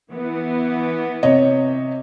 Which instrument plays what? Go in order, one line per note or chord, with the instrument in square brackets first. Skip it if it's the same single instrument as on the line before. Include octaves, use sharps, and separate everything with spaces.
[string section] E3 B3
[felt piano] C3 C#5 D#5